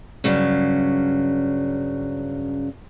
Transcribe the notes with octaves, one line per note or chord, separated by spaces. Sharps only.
G2 C#3 F#3 C#4